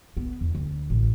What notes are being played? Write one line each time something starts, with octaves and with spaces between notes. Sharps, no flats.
B3
E2
D2
A1